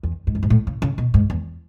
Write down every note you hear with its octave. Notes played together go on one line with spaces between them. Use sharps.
E2
G#2
F#2
G#2
A2
C#3
C#3
B2
G#2
E2